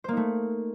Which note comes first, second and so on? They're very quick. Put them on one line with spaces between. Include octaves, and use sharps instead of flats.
C5 A#3 D#4 A3